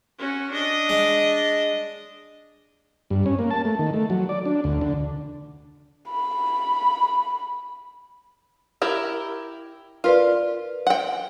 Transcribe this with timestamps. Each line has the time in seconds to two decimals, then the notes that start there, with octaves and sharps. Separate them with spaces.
0.19 C#4 F#4
0.51 D4 D#5
0.89 G#3
3.10 G2
3.26 C#4
3.39 A#3
3.51 A5
3.65 A3
3.79 D#3
3.94 A3
4.10 F#3
4.29 D5
4.46 D4
4.64 D2
4.81 D3
6.10 B5
8.82 E4 G4 A#4
10.04 F4 A#4 B4 D5
10.87 F#5 G5